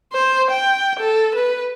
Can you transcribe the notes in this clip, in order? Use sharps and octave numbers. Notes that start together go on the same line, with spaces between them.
C5
G5
A4
B4